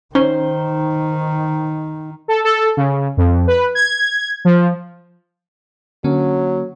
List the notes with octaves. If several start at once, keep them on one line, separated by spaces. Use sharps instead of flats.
D#3 C#4 D#4 C5
A4
A4
C#3
F2
B4
G#6
F3
D3 F#3 A#3 C#4